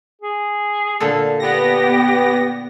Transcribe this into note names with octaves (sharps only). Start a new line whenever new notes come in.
G#4
A#2 D3 A4
B3 G4 A#6